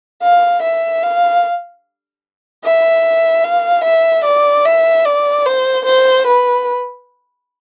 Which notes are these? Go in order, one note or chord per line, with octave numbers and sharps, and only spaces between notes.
F5
E5
F5
E5
F5
E5
D5
E5
D5
C5
C5
B4